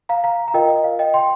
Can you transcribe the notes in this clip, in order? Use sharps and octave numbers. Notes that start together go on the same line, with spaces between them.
F5 A#5
F5 A#5
A#5
F4 A#4 D#5 G5
D#5
F5
D#5 G5
G5 C6